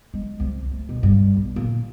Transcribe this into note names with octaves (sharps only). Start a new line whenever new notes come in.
G#3
C2
A3
B2
G2
B1
A#2